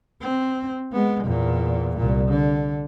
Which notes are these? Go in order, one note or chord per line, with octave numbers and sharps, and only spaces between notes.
C4
G#3 B3
E2 A#2
C2 A#2
D3